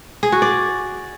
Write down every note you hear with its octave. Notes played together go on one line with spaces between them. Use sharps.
G#4
F#4
D5